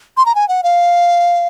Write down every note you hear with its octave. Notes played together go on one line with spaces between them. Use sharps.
C6
A#5
G#5
F#5
F5